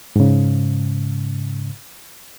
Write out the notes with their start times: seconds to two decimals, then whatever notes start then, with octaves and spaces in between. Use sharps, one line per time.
0.16 G#2 C#3